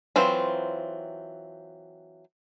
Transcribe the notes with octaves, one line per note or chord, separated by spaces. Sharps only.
E3 F#3 C4 F4